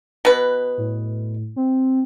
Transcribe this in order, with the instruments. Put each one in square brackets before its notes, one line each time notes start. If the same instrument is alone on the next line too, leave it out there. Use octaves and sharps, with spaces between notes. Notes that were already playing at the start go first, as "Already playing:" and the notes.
[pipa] B2 B4
[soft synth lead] A2
C4